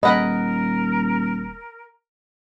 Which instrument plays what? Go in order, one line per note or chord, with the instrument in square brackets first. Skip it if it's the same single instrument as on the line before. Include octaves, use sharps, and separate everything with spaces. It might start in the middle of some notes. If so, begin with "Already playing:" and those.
[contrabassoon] D#1 [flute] A#4 [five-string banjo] B4 F#5 G#5 [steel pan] D#5 B5